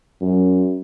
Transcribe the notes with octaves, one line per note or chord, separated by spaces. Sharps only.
F#2